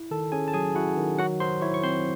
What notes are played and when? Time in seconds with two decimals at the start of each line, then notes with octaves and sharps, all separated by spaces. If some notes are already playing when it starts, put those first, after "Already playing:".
Already playing: E4
0.11 D#3 A4 A5
0.32 C#4 G#4 G#5
0.48 A5
0.53 F#3 G#4 G#5
0.75 E4 F#4 F#5
0.97 D#3
1.18 F#3 F#4 F#5
1.40 F#3 C5 C6
1.62 E4 C#5 C#6
1.74 C#6
1.83 C4 C5 C6